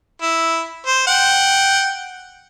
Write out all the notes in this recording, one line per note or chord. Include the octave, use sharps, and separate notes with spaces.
E4
C5
F#5 G5